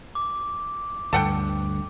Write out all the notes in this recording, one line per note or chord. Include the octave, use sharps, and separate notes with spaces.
D6
D2 G2 A4 F#5 G5